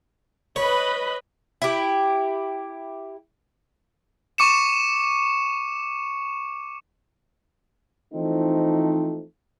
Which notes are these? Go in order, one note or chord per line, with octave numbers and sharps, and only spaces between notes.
B4 C#5 D#5 B5
E4 G4
C#6 D6 C#7 E7
E3 F3 A3 C4 D#4